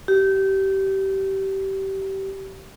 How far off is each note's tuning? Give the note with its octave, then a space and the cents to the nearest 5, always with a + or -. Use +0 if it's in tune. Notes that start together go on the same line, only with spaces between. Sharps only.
G4 -25